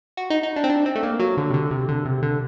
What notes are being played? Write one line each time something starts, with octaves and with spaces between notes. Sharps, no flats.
F#4
D#4
D#4
D4
C4
D4
C4
A3
A#3
F#3
D3
C3
D3
C3
D3
C3
D3